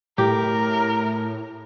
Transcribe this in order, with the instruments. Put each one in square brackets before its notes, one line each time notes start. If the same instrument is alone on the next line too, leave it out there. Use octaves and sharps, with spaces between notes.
[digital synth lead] A2 [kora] G4 [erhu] A#4